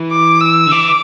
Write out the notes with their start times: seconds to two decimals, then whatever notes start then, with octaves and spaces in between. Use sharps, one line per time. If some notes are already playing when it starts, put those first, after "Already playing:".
Already playing: E3
0.11 D6
0.41 E6
0.66 D3
0.72 E3 D6